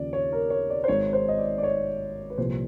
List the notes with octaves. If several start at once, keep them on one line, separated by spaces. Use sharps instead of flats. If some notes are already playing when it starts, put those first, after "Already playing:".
Already playing: D#2 C#3 F3 D5
C#5
A#4
C#5
D5
C5
G#1 G#2 D#3 C#5
C5
D#5
D5
D5
C#5
B4
C2 A#2 F3 C5